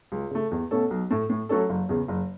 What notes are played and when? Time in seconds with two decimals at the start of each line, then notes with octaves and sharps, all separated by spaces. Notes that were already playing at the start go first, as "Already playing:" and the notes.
0.12 C#2
0.31 C#3 A3
0.51 E2
0.71 B2 A3 C#4 A4
0.91 B1
1.11 A2 A3
1.30 A2
1.49 F#3 A3 C#4 A4
1.69 F#1
1.89 E2 C#3
2.08 F#1